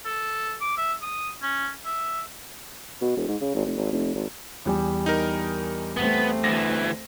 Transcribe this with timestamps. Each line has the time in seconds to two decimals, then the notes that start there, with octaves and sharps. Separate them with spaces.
0.05 A4
0.61 D6
0.77 E5
1.02 D#6
1.42 C#4
1.85 E5
3.02 B2
3.17 E1
3.28 G#2
3.41 C#3
3.55 G#1
3.66 F1
3.77 G#1
3.92 F1
4.15 G#1
4.65 E2 G3 G#5
5.06 D#4 A#4
5.97 A3 B3 C4
6.44 D2 E3 A#6